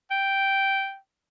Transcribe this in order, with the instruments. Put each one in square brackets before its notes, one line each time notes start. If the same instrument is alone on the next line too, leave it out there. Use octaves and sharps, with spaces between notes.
[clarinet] G5